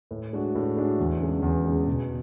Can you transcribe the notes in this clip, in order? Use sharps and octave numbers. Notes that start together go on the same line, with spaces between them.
A2
G#3 D4 F#4
A2
G#3 D4 F#4
E2
C#3 G#3
E2
C#3 G#3
B2